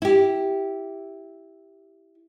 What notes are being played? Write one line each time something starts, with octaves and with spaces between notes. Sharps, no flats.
E4 G4